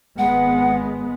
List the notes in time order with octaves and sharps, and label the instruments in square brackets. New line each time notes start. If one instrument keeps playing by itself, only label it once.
[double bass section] G#1 G#3 B3 [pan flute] F#5